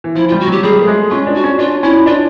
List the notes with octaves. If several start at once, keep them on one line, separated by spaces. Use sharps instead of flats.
E3
F3 E4
F4
G3
F#4
F#3 G4
G3 G#4
A3
G#3
C#4 F4
D4
F#4
C#4
D4 F4
C#4 E4
D4 F4